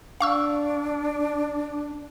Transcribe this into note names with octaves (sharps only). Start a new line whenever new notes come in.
D4 F5 C#6 E6